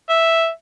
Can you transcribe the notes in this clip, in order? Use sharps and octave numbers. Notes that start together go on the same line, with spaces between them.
E5